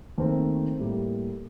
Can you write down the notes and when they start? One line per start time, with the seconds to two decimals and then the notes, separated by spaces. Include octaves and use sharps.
0.18 D#2 D#3 A3 C4
0.79 A2 G3 A#3